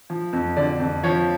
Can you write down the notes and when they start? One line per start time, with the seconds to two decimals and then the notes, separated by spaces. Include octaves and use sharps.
0.10 F3
0.33 F2
0.57 D3 D5
0.80 F2
1.04 F3 C#5